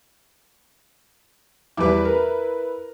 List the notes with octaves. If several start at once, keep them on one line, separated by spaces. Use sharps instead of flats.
E2 G3 E4 B4 D6
A#4